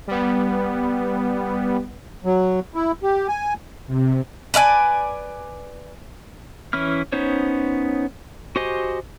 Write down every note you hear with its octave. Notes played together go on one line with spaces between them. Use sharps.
G3 B3
F#3
E4
G4
G#5
C3
B4 D5 F5 G#5
E3 C#4 E4 F6
B3 C#4 D#4 C5 C#5
F#4 G4 C5 D#5 G#5